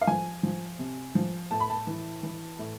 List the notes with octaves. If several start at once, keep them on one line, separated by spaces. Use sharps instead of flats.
F5
F3 G#5
F3
C3
F3
A2 A5
B5
A5
E3
E3
A2